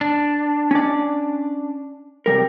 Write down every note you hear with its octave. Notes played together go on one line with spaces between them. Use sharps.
D4
C#4 D5
C3 G3 A#4